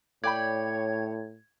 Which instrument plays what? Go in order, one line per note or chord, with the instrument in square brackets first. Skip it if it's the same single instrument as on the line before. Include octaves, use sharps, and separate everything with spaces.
[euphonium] A2 [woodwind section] C#5 [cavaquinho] D5 G5 B5 [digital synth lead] G#6